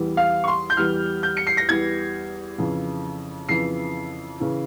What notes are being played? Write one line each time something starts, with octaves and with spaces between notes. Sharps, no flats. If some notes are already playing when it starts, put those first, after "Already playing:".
Already playing: E2 E3 G3
F5
C#6
C6
G6
E2 E3 G3 F6
G6
C#7
C7
A#6
E2 E3 G3 G#6
F2 C#3 E3
F2 C#3 E3 C7
C#3 E3